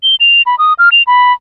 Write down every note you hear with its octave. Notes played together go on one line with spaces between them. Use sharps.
G7
F7
B5
D#6
F6
F7
B5